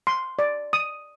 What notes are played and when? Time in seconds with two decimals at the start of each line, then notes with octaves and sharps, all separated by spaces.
0.07 C6
0.39 D5
0.73 D#6